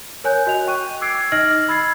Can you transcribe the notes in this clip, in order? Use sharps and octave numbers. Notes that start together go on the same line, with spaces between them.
A#4 C#5 G#5 F#6 G6
F#4 D#5 F7
G5 C#6 F#6 D#7
D6 E6 G#6 C7 D7
D#4 D#5 F6 A#6 F#7
B5 E6 G#6 A6 C7